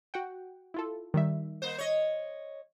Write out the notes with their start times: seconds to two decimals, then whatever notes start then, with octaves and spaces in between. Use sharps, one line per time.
0.14 F#4 F#5 G5
0.74 E4 F4 A4
1.14 D#3 G3 E5
1.62 A#3 C5
1.78 C#5 D#5